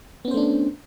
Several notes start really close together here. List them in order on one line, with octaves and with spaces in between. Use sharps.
B3 C#4 C5 A3 D4